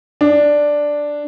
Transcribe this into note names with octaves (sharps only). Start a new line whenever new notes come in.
D4